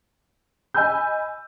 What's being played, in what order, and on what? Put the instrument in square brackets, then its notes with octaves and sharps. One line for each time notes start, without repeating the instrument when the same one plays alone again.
[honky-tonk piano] D#5 G#5 B5 E6 G6